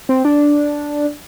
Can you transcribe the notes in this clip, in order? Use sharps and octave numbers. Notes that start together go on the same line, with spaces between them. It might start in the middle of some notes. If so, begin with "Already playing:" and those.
C4
D4